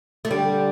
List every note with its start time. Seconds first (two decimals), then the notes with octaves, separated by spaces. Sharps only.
0.25 A3
0.31 D3 G3